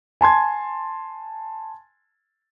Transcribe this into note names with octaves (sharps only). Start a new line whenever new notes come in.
G#5 A5 C6 G#6